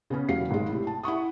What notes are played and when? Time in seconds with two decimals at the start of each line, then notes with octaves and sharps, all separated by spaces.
0.10 C#3 B3 C#4
0.29 E1 F#3 F5 C7
0.51 G#1 G#3
0.69 A2 C3
0.87 A5
1.03 E4 F#5 C#6 D#6